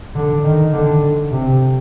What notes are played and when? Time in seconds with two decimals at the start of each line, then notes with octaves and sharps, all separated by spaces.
0.15 D3
0.44 D#3
0.72 D3
1.31 C3